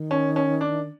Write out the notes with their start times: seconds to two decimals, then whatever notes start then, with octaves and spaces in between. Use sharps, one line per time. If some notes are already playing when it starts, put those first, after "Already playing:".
Already playing: D#3
0.11 C#4
0.36 C#4
0.61 D4